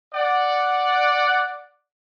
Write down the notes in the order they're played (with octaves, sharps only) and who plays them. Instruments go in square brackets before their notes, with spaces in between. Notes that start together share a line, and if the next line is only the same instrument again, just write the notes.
[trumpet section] D5 F#5